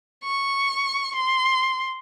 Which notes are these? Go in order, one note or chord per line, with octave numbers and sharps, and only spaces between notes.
C#6
C6